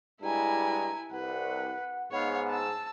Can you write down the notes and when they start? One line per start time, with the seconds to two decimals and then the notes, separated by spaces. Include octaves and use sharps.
0.22 G2 G3 G#3 E4 G#5 A#5
1.12 C2 B4 F#5
2.12 G#2 B3 C#5 F5
2.49 A5 E6